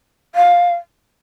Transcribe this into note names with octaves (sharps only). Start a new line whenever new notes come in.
F5